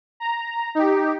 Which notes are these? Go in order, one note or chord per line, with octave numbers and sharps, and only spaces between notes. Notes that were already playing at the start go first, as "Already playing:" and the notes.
A#5
D#4 G4